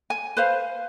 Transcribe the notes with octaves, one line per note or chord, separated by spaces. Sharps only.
G#5
B4 C5 F5